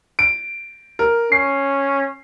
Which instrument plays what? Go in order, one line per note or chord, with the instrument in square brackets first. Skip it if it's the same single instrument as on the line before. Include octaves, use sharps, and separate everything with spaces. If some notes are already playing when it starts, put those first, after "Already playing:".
[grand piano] D7
A#4
[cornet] C#4 [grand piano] C7